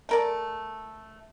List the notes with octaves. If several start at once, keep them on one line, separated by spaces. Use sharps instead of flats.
A3 A#4 D5